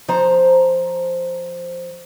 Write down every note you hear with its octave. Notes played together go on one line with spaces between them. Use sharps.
F3 C5 A#5